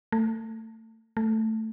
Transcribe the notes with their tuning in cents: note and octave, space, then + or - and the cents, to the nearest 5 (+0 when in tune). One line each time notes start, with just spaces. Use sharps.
A3 +25
A3 +5